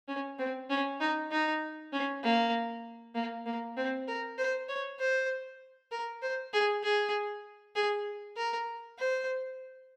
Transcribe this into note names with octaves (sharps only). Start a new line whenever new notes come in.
C#4
C4
C#4
D#4
D#4
C#4
A#3
A#3
A#3
C4
A#4
C5
C#5
C5
A#4
C5
G#4
G#4
G#4
A#4
C5